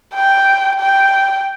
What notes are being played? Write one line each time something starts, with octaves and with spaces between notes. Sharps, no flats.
G5
G5